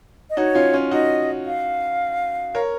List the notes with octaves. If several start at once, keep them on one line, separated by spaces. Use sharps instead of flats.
D#5
D#4 F#4 C#5
C#4 F4
C#4 F4
D#4 F#4 D#5
F5
A#4 C#5